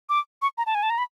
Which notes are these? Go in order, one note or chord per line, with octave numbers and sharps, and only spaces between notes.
D6
C#6
A#5
A5
G#5
A5
A#5
B5